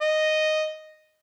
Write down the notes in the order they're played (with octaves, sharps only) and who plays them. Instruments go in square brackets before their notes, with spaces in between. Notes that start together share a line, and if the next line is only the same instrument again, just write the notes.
[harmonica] D#5